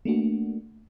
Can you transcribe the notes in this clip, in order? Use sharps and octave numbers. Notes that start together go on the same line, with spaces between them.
A3 A#3 D4 F#4